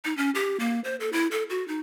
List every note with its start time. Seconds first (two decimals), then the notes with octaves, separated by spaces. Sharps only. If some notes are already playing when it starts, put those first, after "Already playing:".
0.05 D#4
0.17 C#4
0.35 G4
0.60 A#3
0.84 C5
1.00 A4
1.13 E4
1.31 A4
1.50 F#4
1.68 D#4